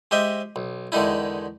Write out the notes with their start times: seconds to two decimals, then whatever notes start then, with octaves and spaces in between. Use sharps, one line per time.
0.11 G#3 G4 C5 D#5 E5
0.56 B1
0.92 E2 D3 D#3 G#3 D#4 E4